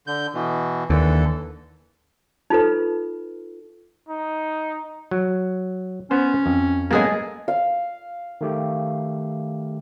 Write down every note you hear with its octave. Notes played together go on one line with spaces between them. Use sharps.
D3 G6
B2 E3
D#2 D3 E3 A4
D#4 F4 A4 B4
D#4
F#3
B3 C#4 C5
F2
G#3 A#3 B3 C#4 G#4 A4
F5
D#3 A3 G4